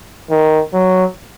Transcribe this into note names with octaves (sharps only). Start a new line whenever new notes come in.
D#3
F#3